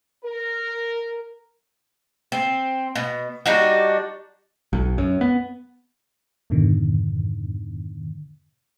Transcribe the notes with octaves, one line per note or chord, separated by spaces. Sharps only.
A#4
C4
B2
G3 D4 D#4 F#4
B1
F#2
B3
F2 G#2 B2 D3 D#3